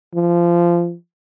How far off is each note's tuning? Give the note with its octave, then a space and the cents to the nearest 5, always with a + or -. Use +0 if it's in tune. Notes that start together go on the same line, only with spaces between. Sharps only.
F3 -20